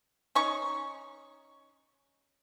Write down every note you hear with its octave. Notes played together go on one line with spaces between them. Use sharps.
C#4 D#4 C#6